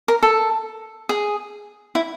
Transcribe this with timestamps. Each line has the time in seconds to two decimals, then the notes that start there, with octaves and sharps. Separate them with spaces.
0.08 A#4
0.23 A4
1.09 G#4
1.95 E4